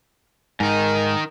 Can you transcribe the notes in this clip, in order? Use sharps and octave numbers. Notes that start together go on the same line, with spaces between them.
G#2 D#3 D#4 A#4